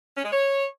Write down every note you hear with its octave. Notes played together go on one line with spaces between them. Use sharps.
C#4
G#3
C#5